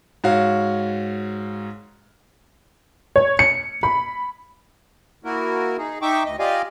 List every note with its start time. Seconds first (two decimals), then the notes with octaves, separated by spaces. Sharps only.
0.24 G#2 F#4 C#5 F5
3.16 C#5
3.39 C#7
3.83 B5
5.24 A#3 E4 F#4 A#4
5.78 D#4 G#4
6.02 D#4 E5 G5 C#6 D6
6.25 D2 D#5
6.39 F4 G4 D5 D#5 F5 G#5